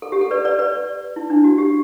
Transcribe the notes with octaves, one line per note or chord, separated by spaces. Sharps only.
A4
G4
A4
B4 D5
B4 D5
B4 D5
E4
D4
F#4
G4